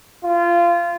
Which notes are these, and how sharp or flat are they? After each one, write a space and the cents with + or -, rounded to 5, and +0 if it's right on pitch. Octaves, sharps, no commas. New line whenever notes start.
F4 -20